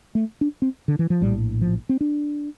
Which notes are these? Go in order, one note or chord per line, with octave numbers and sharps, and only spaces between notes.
A3
D4
C4
D3
E3
F3
A#1 A2 G3
F3
C4
D4